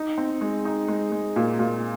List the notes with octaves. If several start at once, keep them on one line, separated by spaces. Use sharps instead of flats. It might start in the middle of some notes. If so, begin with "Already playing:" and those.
Already playing: D#4
C4
G#3
D#4
G#3
G#3
A#2
A#2